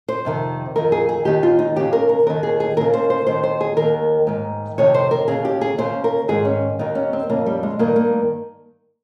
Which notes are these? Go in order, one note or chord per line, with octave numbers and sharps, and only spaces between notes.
C5
F2 C3 D#3
F2 D#3 A#4
G#4
G#4
D#2 D#3 G4
F4
D#4
D#2 C#3 G4
A#4
A#4
D#2 D#3 A#4
G#4
G#4
D#2 C#3 A#4
C5
C5
D#2 D#3 C5
C5
G#4
D#3 A#4
D#2
G#2 D#3
F2 C3 D#3 C#5
C5
A#4
D#2 C#3 G#4
G4
G#4
D#2 C#3 C5
A#4
G#2 D#3 G#4
C#4
D#2 D#3 D#4
C#4
C4
F2 C#3 A#3
G3
G#3
G2 D#3 A#3
A#3